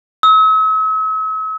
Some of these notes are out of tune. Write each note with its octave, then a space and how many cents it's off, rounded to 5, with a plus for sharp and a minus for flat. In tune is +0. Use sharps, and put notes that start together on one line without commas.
E6 -45